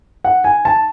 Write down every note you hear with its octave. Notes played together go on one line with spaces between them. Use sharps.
F#5
G#5
A5